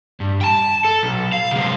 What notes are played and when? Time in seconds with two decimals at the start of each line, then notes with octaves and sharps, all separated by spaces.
0.20 G2
0.41 G5 A5
0.85 A4
1.03 B1
1.32 F5
1.51 C3 G#3